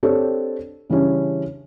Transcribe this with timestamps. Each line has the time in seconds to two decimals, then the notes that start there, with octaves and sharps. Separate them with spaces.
0.03 C4 D4 G4 A4 C#5 D5
0.90 C#3 E3 G3 C#4 D4